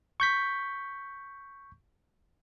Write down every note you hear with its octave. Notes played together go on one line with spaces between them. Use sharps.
C#6 G6 B6